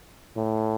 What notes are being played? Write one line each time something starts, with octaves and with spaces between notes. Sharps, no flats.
A2